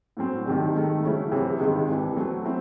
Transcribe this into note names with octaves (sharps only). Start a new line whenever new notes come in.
A2 F#3 C4
C2 C3 D#3
G#2 D#3 A3
C#3 F#3 A3 C#4 E4
C3 E3 C4 E4 G#4
C#2 C3 D#3 G#3
C2 C3 E3
F#3 A3 C4
C4 E4